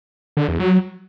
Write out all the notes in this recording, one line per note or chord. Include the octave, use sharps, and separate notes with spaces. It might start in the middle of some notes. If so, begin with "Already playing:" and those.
D3
E2
F#3